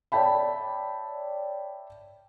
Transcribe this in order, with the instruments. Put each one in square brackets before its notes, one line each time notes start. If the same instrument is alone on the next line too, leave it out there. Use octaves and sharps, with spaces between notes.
[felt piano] C#5 D5 E5 G5 A5 B5